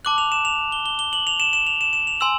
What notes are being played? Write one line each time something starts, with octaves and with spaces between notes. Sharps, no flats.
A5 D6 F#6 F#7
F7
E7
F7
G7
G7
G7
F#7
F7
E7
E7
F7
E7
E7
F7
G#5 C6 E6 F#7